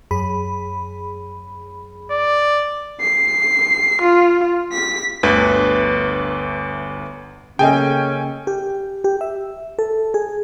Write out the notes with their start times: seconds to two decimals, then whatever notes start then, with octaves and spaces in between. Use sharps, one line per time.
0.11 F#2 G#4 B5
2.12 D5
3.01 C7
4.02 F4
4.72 B6
5.23 G1 D2 B4
7.59 C#3 A#3 C#4 G#4 A4 D#5 G5 G#5
8.47 G4
9.04 G4
9.21 E5
9.79 A4
10.14 G#4